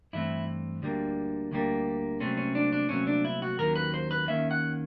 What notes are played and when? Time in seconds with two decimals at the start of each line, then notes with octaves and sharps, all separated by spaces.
0.13 G2 E3 A3 C4 E4
0.82 D2 D3 G3 A#3
1.51 D2 D3 G3 A#3
2.20 C2 A#2 F#3 A3 C4 C#4
2.37 C#4
2.55 D4
2.72 D4
2.89 C2 A#2 F#3 A3 C4 C#4
3.07 D4
3.25 E4
3.42 F#4
3.58 D#2 D#3 F#3 A#3 C#4 A#4
3.76 B4
3.94 C5
4.11 B4
4.28 D#2 D#3 F#3 A#3 C#4 E5
4.51 F#5